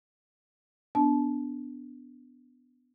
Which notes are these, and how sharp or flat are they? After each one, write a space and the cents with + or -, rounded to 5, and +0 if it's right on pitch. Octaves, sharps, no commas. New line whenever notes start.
B3 +10 D4 -10 A5 -25